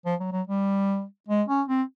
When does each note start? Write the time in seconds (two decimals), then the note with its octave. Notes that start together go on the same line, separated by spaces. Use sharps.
0.06 F3
0.20 F#3
0.32 F#3
0.47 G3
1.29 G#3
1.48 C#4
1.68 C4